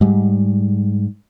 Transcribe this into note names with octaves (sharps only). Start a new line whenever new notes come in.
G#2 G3